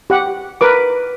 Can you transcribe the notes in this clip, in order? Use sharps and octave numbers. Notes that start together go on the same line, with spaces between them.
G4 F#5
A#4 B4 D6